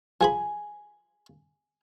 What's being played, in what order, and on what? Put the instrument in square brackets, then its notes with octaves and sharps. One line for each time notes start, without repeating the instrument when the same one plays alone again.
[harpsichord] F3 G#4 B5 [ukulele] G#5